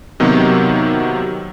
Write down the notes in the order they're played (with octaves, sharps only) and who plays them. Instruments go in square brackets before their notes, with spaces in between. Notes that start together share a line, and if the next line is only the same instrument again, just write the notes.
[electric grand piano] C3 D#3 F#3 A#3 B3